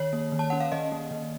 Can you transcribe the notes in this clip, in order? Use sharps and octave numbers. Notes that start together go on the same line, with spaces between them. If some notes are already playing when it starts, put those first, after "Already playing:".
Already playing: D#3 C#5
A#3
D#3
A5
C#4 F#5
F5
D#3 D#5
A#3
D#3